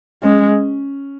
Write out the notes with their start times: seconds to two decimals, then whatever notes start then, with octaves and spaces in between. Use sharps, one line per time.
0.23 G#3 C#4